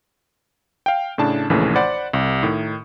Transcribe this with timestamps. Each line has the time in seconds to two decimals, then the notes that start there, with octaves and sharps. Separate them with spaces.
0.86 F5 G5
1.18 A2 C#3 D4 A5
1.50 A#1 D#2 C#3 E3 A3
1.76 C5 D5 F#5 B5
2.13 C2
2.43 A2 D#3